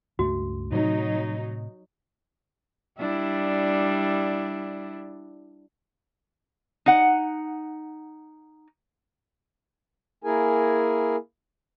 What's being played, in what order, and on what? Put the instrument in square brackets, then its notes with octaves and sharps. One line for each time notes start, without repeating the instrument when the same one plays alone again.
[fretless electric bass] C#2 G2 A3 [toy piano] F#4
[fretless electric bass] A2 C3 [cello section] F#3 D#4
[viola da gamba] G3 D4 E4
[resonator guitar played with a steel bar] D#4 F#5
[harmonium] A#3 E4 G#4 A#4 G#5